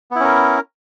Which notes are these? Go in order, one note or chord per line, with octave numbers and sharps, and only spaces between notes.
B3 C#4 E4 A#4